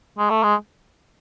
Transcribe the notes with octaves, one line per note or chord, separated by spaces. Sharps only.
G#3
A3
G#3